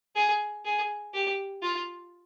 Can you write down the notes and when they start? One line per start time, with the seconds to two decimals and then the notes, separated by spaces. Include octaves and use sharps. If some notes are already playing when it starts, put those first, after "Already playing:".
0.15 G#4
0.65 G#4
1.14 G4
1.62 F4